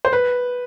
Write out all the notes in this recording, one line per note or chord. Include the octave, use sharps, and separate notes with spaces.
C5
B4